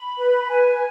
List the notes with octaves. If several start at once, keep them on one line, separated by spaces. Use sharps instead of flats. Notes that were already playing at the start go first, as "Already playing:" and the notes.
Already playing: B5
B4
G#5